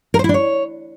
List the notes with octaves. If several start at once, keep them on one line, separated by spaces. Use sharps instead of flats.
A#4
C5
E4
D4
C#5